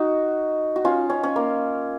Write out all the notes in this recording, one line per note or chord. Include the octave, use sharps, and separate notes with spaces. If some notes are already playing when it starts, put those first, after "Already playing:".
Already playing: D#4 F#4
F#4
C#4 F4
C#4
C#4
A#3